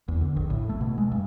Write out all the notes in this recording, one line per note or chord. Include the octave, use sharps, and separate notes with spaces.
E2
D3
A#1
A2
A3
B2
G#3
G2